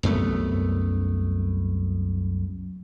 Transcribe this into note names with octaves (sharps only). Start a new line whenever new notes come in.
C2 F#2 A3 B3